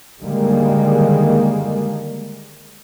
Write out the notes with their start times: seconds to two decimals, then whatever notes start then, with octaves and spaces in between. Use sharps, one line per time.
0.21 D3 D#3 G3 G#3 A#3